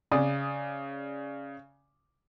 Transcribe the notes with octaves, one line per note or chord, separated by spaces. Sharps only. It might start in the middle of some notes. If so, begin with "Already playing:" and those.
C#3 D5 D#6